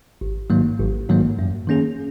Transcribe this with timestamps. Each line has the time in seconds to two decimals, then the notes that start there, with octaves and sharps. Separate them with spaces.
0.21 G#1
0.50 G#2 D#3 F#3 A#3
0.79 G#1
1.09 G#2 D#3 F#3 A#3
1.39 F#2
1.67 D#3 A#3 C#4 G#4